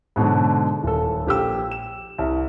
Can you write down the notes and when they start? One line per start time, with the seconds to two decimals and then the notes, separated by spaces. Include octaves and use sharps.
0.16 G#2 B2 D3 F#3
0.83 D#1 A4
1.26 A#1 G4 E6
1.71 E7
2.18 C2